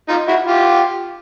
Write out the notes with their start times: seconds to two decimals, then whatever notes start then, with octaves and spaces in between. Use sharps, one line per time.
0.08 D#4 F4
0.28 E4 F#4
0.46 F4 G4